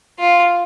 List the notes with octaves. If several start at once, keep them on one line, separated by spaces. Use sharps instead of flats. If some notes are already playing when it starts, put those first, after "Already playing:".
F4